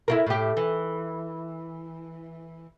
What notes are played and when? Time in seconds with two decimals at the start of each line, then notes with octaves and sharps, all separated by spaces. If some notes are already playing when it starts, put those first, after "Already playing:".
0.08 E4 F4 A#4
0.26 A2 G4
0.57 E3